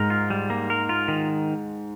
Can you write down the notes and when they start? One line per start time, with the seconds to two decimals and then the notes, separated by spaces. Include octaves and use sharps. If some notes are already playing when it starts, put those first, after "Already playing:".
Already playing: G#2 A#4
0.10 F4
0.30 G3
0.50 A#3
0.70 A#4
0.89 F4
1.08 D#3